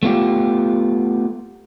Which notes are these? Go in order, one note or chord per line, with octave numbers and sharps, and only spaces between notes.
A3 B3 F4 G4